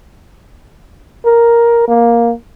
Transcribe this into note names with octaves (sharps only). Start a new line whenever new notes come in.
A#4
A#3